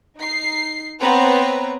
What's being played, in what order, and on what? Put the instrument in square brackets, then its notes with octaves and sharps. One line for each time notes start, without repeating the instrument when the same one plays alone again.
[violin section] D#4 C7
B3 C4 B4 C#5 A#5